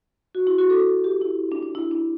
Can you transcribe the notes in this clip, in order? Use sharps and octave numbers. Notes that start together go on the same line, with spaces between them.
F#4
E4
F#4
A4
G4
E4
D4
D4
E4
D4